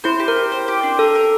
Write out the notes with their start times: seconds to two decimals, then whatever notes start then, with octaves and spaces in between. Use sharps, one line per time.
0.04 E4 C5
0.20 G4
0.28 A#4
0.36 G4
0.52 C5
0.68 G4
0.83 D4
0.99 A4 A#4
1.15 A#4